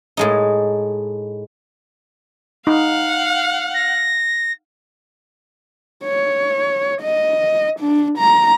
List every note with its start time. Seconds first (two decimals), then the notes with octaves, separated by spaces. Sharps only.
0.17 A2 G#3 D#4
2.67 D#4 F5 F#5
3.74 A#6
6.04 C#5
7.02 D#5
7.80 D4
8.19 A#5